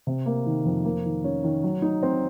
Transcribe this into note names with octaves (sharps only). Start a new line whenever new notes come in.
C3
A#3
D#3
F2
A#3
D#3
C#4
D#3
F#3
D#4
C4